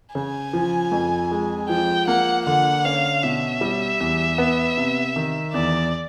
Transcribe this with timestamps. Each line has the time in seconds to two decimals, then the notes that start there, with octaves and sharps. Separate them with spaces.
0.15 C#3 G#5
0.53 F3
0.92 F2
1.31 G#3
1.69 F3 G5
2.07 A#3 F#5
2.45 D3 F#5
2.85 C#4 F5
3.23 B2 E5
3.61 G3
4.00 E2
4.38 B3
4.77 C3
5.16 D#3
5.54 E2 D5